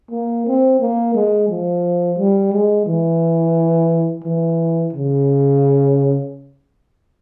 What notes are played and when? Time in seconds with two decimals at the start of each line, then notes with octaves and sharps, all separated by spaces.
0.11 A#3
0.47 C4
0.80 A#3
1.15 G#3
1.49 F3
2.19 G3
2.53 G#3
2.87 E3
4.24 E3
4.93 C#3